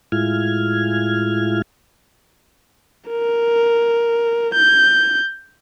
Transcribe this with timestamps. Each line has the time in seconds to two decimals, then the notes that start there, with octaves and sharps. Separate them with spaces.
0.12 A2 G#3 E4 F4 F6 G#6
3.09 A#4
4.55 G6